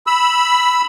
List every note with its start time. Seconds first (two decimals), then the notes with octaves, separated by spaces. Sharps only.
0.07 B5 E6